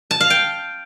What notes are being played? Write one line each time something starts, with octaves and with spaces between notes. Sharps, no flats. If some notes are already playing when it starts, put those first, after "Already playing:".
A5
F5
G5